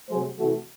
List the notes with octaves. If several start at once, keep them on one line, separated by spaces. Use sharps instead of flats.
C3 F#3 A3 G#4 C5
C3 E3 A3 F#4 A4